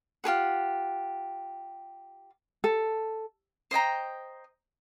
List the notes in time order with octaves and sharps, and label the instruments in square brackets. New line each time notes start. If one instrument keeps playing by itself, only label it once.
[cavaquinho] F4 G4 G#4 F#5
[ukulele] A4
[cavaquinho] C5 D#5 G5 A#5